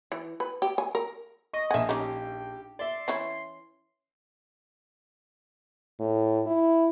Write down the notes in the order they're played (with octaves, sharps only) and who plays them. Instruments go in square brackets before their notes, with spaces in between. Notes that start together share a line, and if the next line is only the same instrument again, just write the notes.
[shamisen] E3
B4
G4
G#5
A#4
[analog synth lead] D#5 [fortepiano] C#6
[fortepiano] A#1 G#5 [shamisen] E5 F#5
[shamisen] C#4 D#4 [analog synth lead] G4
[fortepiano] D5 E5 [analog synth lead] C6
[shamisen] E3 C#4 E4
[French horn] A2
E4